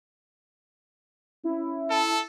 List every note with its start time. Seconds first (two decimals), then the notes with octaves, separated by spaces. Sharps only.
1.44 C#4 E4
1.91 A4 A5